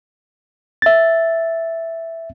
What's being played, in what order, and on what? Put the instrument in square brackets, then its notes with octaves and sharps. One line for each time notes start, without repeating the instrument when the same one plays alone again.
[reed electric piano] E5 A6